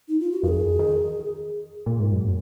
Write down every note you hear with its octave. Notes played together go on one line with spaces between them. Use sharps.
D#4
F4
F#4
F2 G#4 A#4
D#3
A#2
G#2
F#2